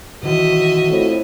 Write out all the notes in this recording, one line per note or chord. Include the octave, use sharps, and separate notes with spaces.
B2 D#3 E3 F#4 D#5 E5
F2 A2